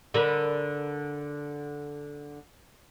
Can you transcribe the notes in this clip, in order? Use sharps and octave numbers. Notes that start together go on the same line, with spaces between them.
D3 A#4 B4